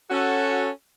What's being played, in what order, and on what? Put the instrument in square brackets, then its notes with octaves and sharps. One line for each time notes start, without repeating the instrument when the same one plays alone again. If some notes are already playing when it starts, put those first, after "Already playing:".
[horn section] C#4 F#4 A4